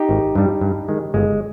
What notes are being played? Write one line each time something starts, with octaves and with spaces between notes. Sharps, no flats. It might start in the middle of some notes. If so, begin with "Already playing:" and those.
Already playing: D#4 G4
G#1
G2 G3
G2
D#3 G#3
G1 G#3